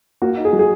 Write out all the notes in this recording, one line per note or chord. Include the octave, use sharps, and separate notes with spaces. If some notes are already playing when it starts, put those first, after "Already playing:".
A#3 F#4
D#4
G#4
F#3
G#4